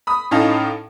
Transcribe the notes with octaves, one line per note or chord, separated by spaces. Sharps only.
B5 D#6
A2 C#4 D#4 F5 A5